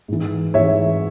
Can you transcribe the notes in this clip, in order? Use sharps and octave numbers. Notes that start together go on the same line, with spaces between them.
G#2 E3
G#2 E3 C#5 E5